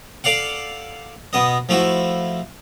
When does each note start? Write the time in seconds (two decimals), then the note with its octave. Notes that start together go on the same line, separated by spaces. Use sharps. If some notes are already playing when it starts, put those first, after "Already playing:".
0.24 A4 D5 F5 F#5
1.33 B2 B3 D#5
1.69 F3 A3 E4 F#4